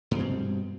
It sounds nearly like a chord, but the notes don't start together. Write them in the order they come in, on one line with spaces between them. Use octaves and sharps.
G2 C4 B2